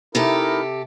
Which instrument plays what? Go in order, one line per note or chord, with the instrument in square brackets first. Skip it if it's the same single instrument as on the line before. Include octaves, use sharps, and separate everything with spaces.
[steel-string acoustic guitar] C3 G4 A4 [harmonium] D#4 E4 A#4